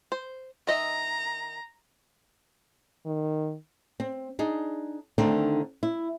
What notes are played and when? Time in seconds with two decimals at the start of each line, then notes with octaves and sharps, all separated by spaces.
0.12 C5
0.67 D#3 D#5 E5 A#5
3.06 D#3
4.00 C4
4.39 D4 D#4 G#4
5.18 D3 D#3 A3 C4 D4 D#4
5.83 E4